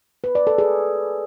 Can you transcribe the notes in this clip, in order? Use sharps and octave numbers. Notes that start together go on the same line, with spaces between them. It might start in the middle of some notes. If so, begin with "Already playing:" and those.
B4
D5
A4
G#4